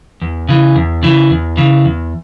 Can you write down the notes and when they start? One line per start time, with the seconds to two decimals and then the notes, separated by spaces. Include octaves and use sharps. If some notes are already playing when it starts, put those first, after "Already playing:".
0.22 E2
0.49 C#3 E3
0.76 E2
1.03 C#3 E3
1.30 E2
1.57 C#3 E3
1.85 E2